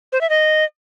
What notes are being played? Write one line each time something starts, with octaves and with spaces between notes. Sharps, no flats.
C5
E5
D#5